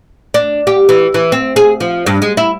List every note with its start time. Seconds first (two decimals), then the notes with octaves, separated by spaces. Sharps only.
0.34 D4
0.67 G4
0.89 E3
1.14 E3
1.32 C4
1.56 G#4
1.80 F3
2.06 G2
2.22 G#3
2.37 E4